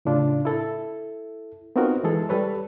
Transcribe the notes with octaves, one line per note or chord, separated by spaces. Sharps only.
A2 C#3 D4 F4
E4 A4
B3 C4 D#4 F4 F#4 A#4
E3 G#3 G#4 A4
G3 A4 B4 C#5